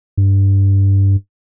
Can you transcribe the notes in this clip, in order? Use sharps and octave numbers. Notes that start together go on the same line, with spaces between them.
G2